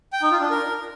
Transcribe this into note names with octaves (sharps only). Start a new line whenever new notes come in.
G5
D#4
F4
D4
A#4